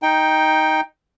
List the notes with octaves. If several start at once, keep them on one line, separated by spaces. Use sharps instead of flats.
D#4 G5